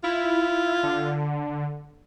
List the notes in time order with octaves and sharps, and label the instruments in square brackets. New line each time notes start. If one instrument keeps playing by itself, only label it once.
[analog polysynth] E4 [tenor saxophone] F4
[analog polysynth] D3